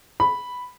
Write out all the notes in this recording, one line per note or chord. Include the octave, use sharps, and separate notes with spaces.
B5